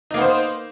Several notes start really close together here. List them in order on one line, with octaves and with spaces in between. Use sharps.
D#4 A#3 B3 C5